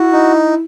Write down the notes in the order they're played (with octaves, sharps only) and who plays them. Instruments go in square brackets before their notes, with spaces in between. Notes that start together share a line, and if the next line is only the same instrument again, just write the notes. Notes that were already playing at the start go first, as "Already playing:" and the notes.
Already playing: [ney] E4 [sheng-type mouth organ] F#4
[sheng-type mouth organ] D#4